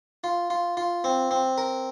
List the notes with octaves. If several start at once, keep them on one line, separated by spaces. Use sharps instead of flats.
F4
F4
F4
C4
C4
A#4